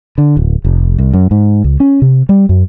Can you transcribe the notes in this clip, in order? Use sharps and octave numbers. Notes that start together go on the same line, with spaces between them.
D3
D1
F1
C2
F#2
G#2
C#2
C#4
C3
G3
F#2